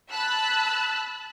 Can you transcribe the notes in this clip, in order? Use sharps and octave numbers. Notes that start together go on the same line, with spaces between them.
A5 B5 E6 F#6